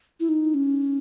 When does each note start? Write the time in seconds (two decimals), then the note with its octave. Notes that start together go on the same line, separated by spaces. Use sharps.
0.20 E4
0.29 D#4
0.54 C#4